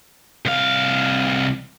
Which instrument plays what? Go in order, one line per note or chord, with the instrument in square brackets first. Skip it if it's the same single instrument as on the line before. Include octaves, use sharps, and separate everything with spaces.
[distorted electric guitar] C2 F5